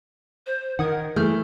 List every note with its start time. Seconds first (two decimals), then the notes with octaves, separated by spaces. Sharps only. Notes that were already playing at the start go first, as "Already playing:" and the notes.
0.46 C5
0.79 D#3 A#4 F#5 D#6 G#6
1.16 E3 A3 G#4 A4 F6 G6